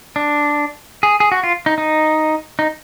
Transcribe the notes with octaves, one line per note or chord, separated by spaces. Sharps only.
D4
G#4
G#4
F#4
F4
D#4
D#4
D#4